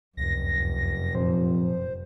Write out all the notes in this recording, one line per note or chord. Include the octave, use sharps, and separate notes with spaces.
F1 C#2 F#2 A#6
F2 A#2 C5